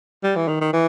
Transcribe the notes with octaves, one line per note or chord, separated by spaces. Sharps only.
G3
E3
D#3
D#3
E3